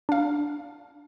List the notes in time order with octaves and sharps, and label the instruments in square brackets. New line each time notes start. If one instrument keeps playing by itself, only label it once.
[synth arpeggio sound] D4 F5